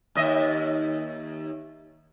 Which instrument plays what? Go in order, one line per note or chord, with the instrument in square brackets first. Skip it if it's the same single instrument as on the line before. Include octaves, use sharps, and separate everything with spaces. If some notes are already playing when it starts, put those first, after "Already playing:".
[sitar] D#2 D#5 E5